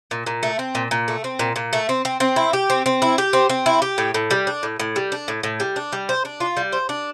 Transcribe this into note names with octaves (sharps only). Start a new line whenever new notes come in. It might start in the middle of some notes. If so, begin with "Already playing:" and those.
A#2
A#2
A3
C4
A#2
A#2
A3
C4
A#2
A#2
A3
C4
C4
C4
E4
G4
C4
C4
E4
G4
C4
C4
E4
G4
A2
A2
G3
D4
A2
A2
G3
D4
A2
A2
G3
D4
G3
C5
D4
F4
G3
C5
D4